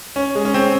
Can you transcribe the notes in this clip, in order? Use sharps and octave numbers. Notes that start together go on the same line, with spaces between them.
C#4
G#3
C#4
C4